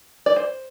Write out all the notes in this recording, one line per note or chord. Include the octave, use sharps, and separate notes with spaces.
D5
C5